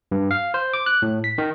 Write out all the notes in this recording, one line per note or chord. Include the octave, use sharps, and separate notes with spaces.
G2
F5
C5
D6
F#6
A2
B6
D#3